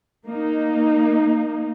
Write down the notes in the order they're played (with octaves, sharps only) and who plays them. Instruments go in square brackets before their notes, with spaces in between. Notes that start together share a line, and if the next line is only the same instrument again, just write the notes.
[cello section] A#3 D#4